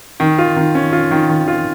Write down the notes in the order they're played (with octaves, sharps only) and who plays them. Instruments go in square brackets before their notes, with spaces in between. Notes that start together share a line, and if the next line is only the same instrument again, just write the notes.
[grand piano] D#3
F4
D#3
C#4
F4
D#3
D#3
F4